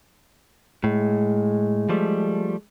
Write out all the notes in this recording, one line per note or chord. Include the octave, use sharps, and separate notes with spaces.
A2 G#3
F3 G3 A3